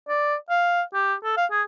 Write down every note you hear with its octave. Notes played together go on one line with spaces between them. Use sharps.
D5
F5
G4
A4
F5
G#4